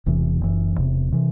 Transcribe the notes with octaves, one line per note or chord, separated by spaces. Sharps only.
E1 E2 C3 E3
F#1 F#2 E3
E1 E2 C3
C3 E3